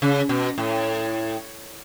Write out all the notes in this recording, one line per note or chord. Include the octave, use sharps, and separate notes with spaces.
C#3
B2
A2